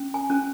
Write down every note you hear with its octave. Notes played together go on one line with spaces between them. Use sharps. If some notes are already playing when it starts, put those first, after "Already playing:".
Already playing: C#4
G#5
C#4